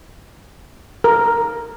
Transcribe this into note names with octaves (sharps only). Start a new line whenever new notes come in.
A#4